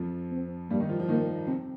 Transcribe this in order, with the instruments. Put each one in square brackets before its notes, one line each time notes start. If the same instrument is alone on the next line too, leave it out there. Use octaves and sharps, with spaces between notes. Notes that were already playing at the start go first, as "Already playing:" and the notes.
Already playing: [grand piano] F2 F3
[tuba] C4
[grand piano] G2 G3 [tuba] A#3
[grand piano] D#3 D#4
F3 F4
F3 F4
[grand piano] D#3 D#4 [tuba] A#3
[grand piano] C3 C4